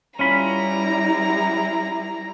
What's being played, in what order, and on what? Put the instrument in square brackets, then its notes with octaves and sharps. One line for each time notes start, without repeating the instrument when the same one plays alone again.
[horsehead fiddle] G3 E4 [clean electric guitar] C#4 F4 B5 [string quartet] A#5